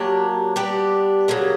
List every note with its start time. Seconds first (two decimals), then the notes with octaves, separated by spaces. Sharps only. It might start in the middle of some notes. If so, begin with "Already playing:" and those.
Already playing: F#3 A#3 D4 G4
0.56 G3 B3 D4 G4
1.28 C#3 F#3 A#3